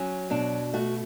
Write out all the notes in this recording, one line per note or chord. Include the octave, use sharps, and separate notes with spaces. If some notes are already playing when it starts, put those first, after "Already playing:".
Already playing: F#3 C#4
B2 D4
A3 F#4